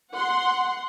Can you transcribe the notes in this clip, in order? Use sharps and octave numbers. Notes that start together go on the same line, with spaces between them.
F#5 C6